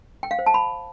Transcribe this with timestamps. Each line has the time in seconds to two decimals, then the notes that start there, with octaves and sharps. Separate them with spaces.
0.23 G5
0.31 F5
0.39 C5
0.46 A5
0.54 B5